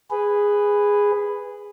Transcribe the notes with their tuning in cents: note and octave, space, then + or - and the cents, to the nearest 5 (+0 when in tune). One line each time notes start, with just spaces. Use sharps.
G#4 -10 B4 +5